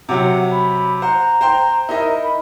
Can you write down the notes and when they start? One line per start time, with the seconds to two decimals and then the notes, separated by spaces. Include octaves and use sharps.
0.09 C3 F#3 F#5
0.51 B5
1.02 C5 F#5 A#5
1.41 C5 G5 C6
1.89 D#4 E4 A#4 D#5
2.23 B5